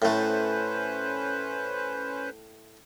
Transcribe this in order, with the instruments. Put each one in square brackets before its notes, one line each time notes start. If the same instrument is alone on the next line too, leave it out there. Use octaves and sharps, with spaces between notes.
[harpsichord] A2 A3 [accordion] C#4 B4 C5